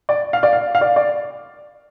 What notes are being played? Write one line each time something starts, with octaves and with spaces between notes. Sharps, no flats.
D5
F5
D5
F5
F5
D5
D5